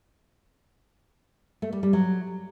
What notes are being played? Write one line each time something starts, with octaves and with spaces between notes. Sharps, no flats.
A3
G3
G3
F#3